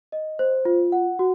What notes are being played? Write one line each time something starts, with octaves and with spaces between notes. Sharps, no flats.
D#5
C5
F4
F#5
F#4